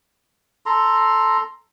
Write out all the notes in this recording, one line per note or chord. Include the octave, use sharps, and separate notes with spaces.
A4 A#5 C6